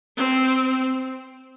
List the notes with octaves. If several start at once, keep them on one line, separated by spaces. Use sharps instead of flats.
C4